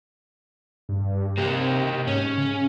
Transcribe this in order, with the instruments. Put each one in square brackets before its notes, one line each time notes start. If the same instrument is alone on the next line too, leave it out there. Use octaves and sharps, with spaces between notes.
[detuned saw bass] G2
[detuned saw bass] C3 [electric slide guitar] A#3 G4
[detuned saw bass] G#2 [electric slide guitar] C#4
[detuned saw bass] C#3